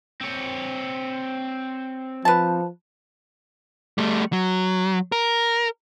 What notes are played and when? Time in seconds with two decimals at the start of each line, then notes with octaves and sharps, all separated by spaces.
0.21 C4 C#5
2.25 F3 B4 A5
3.98 G3 A3
4.33 F#3
5.12 A#4